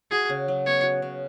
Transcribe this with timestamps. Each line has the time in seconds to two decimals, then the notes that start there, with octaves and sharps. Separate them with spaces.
0.11 F#4 G#4
0.30 C#3
0.48 F#3
0.66 B3 C#5
0.83 F#4
1.02 C#3